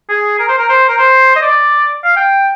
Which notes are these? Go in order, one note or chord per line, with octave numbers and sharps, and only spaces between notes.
G#4
A#4
C5
A#4
C5
A#4
C5
D#5
D5
F5
G5